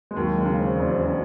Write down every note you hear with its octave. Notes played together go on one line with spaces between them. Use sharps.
G#3
D#2 F#3
G#3
C#3
C4
E1
C4
C4
C#4